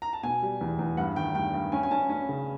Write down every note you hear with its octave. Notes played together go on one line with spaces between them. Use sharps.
A#5
A5
B2 G#5
G3
E2
E2
G2 F#5
D#3 G5
G2 G5
G2
C#4 G#5
G#5
C#4 A5
C#4
C#3